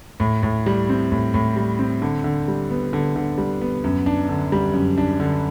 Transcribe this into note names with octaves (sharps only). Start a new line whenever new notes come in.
A2
A2
G3
C4
A2
A2
G3
C4
D3
D3
G3
B3
D3
D3
G3
B3
F#2
D4
D3
G3
F#2
D4
D3